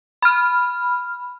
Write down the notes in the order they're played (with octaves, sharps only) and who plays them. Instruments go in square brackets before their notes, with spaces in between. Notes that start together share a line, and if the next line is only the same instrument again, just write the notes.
[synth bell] B5 F6